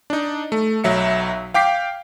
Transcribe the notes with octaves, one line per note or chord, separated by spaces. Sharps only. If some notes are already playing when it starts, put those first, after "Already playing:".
D4 D#4
A3
B1 F#3 E5 C#7
F5 G5 D6 B6 C7